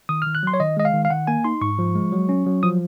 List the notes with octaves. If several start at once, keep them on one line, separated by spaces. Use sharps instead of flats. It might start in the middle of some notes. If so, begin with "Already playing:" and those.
D#3 D#6
D#3 F6
F#6
F#3 C6
C#5
D#3 D#5
G#3 D#5
F5
D#3
F5
D#3 F#5
A#3 G#5
D#4 C6
G#2 C#6
F3
G#3
F#3
C#4
F#3
F3 D#6